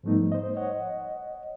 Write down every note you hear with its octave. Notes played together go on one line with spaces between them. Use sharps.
G#2 F3 G3 A3 B3 D#4
C5 D#5
C#5 D#5 F#5